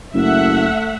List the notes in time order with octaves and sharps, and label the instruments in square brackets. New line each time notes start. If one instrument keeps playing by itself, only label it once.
[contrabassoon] F#1 [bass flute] A3 [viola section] E5 F#5